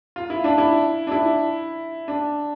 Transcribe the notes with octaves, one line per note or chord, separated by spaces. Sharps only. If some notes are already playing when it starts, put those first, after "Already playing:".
F4
E4
D4
E4
D4
E4
D4